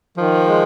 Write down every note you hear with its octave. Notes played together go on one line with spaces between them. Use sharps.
D#3 F3
G#3